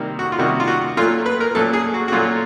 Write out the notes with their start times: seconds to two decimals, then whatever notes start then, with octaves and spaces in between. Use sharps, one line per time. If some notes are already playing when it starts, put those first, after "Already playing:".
Already playing: C3 D#3 G3 A#3
0.19 F#4
0.32 F4
0.38 C3 D#3 G3 A#3 F#4
0.60 F4
0.68 F#4
0.97 A#2 F#3 A3 F4
1.26 B4
1.40 A#4
1.55 A#2 F#3 A3 A4
1.73 G#4
1.94 F#4
2.08 F#4
2.12 A#2 F#3 A3 F4